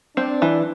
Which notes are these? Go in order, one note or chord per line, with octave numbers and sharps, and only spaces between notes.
C4 D4
E3